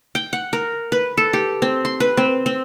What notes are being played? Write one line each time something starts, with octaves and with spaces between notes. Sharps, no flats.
G5
F#5
A#4
B4
A4
G4
C4
C6
B4
C4
C4